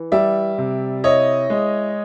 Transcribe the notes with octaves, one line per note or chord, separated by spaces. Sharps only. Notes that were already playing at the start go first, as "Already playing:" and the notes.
Already playing: E3
G3 D5 E5
C3
E4 C#5 D#5
G#3